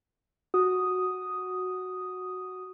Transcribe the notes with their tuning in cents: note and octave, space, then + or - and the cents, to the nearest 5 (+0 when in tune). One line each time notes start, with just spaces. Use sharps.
F#4 +0 D#6 +0